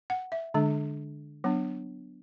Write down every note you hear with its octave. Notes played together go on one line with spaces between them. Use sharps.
F#5
E5
D3 G#3 D4
F#3 B3 D4